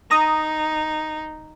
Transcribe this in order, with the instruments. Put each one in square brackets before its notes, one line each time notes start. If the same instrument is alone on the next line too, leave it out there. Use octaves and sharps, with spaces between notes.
[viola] D#4 [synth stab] A#5 D#6